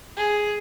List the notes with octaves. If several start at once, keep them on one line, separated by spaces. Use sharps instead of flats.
G#4